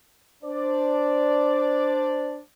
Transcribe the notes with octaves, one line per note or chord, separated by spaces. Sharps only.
D4 C5 D5